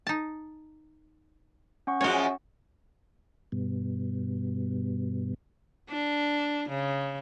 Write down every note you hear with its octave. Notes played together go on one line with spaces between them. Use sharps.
D#4 A5
C#4 F#5 C#6
F#2 F3 G#3 F#4 C#5
G2 B2
D4
C#3